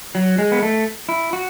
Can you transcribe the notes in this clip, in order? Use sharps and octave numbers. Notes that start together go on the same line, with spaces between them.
F#3
G#3
B3
A3
E4
F#4